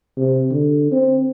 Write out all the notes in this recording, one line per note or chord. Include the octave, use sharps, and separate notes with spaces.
C3
D3
C4